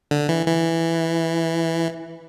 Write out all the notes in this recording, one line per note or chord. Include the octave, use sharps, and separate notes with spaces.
D3
E3
E3